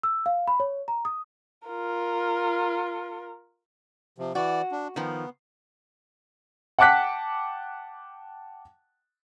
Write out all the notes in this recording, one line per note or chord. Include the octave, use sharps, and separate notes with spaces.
E6
F5
B5
C#5
A#5
D#6
F4 A#4
C3 F3
E3 F#4 D5
D4
D#3 F3 B3
F#5 G5 A5 D6 F#6 B6